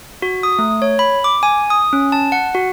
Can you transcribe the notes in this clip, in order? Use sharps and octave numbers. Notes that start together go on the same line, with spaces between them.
F#4
D#6
A3
C#5
B5
D6
G#5
D#6
C#4
A5
F#5
F#4